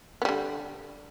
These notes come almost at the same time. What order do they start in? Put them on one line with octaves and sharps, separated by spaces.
B3 G3 D3